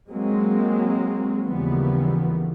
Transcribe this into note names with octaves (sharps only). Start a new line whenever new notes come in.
F#3 G#3 A#3 C4
D#2 C#3 E3 F3 G3 B3